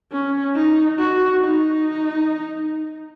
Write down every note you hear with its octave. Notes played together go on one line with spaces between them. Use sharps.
C#4
D#4
F#4
D#4